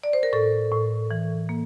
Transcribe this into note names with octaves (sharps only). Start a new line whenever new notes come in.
D5
C5
A#4
A2 A4
A2
E3
A#3